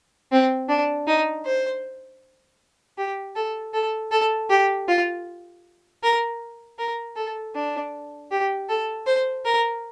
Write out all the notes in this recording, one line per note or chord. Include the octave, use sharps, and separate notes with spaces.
C4
D4
D#4
C5
G4
A4
A4
A4
G4
F4
A#4
A#4
A4
D4
G4
A4
C5
A#4